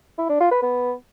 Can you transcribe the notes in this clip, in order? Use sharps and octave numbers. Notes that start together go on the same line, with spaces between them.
E4
D4
F4
B4
B3